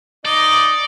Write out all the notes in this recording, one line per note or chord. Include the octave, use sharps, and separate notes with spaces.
D#4 D5 D#5